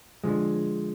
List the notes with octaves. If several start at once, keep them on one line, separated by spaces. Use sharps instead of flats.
D3 F3 G#3